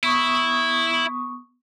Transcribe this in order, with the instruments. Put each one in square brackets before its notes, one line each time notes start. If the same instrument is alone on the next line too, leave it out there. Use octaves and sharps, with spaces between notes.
[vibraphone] B3 C#6 D#6 [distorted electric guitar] E4